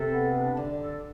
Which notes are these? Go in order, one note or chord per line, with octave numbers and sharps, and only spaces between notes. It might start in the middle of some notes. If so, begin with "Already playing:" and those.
Already playing: C3 A4
B3
D4
D3 D4
A4